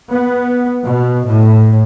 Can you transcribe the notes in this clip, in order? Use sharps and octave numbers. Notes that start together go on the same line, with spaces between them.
B3
B2
A2